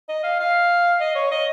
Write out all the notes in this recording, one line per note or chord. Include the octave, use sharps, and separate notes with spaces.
D#5
F5
F5
D#5
C#5
D#5